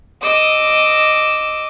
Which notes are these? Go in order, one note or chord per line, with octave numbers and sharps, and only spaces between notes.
D#5 D6 E6